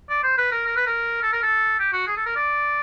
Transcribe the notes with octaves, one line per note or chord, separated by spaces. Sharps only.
D5
C5
B4
A#4
A#4
B4
A#4
A4
A#4
A4
G4
F#4
G#4
A4
A#4
D5